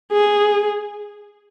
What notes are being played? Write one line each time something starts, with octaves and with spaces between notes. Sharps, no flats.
G#4